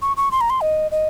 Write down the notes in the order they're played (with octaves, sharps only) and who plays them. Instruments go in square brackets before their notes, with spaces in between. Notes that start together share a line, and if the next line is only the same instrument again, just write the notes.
[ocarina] C#6
C#6
C6
A#5
C6
D#5
D#5